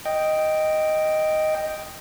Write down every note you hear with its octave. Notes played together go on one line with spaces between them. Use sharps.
D#5 G5